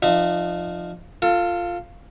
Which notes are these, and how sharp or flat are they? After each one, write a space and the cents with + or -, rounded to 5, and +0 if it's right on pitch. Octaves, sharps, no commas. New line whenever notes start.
F3 +0 D#4 -40 E5 -25
F4 +0 A4 +30